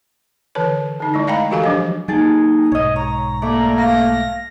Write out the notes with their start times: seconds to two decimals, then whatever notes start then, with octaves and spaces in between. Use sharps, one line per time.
0.55 D3 E3 B4 C#5
1.00 D3 D#4
1.14 G#3 A3 E4
1.27 D#5 F5 G5 A#5 B5
1.51 E3 F#4 G4 A4 F5 G#5
1.64 F3 F#3 D4 G4 D#5
2.08 F#3 A#3 D#4 G#4 G5 A5
2.72 B1 G#2 C#5 D#5
2.96 C#5 A#5
3.42 A3 A#3 D5
3.78 F5 A#6